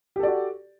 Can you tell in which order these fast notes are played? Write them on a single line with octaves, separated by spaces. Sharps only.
G4 A4 D5 F#4